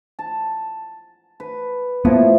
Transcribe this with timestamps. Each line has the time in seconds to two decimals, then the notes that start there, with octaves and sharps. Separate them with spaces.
0.19 A5
1.40 B4
2.05 A2 F3 A#3 B3